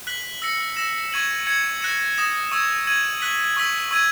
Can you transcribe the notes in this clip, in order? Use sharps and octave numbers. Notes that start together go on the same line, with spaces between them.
F#6 B6 F#7
E6 A#6 C#7
E6 A#6 E7
C#6 G#6 D#7 F#7
G#6 C#7 F#7
F#6 A#6 C#7 E7
D#6 A#6 E7
C#6 E6 G#6
G#6 D#7 F#7
F#6 B6 F#7
C#6 E6 B6 F#7
C#6 E6 G#6 D#7 F#7